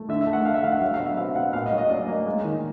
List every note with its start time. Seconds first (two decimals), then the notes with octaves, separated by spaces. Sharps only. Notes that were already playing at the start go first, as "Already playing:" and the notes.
Already playing: A3
0.09 D3 E5
0.21 E5
0.27 A3
0.33 F#5
0.45 A3 F5
0.54 E5
0.63 D3 F5
0.72 F#5
0.82 F#3 F5
0.94 F5
1.00 B2
1.06 E5
1.17 C4 F5
1.35 B2 F#5
1.53 A#2 F5
1.66 D#5
1.72 F#3
1.78 D#5
1.89 C#4 D5
2.08 A#3
2.26 G#3
2.44 D#3